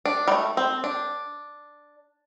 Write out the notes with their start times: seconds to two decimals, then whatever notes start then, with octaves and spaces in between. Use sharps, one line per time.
0.05 D4
0.28 G3
0.32 A3
0.57 C4
0.84 D4